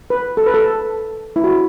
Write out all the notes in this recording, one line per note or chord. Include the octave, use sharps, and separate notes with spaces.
B4
A4
B4
A4
E4
F#4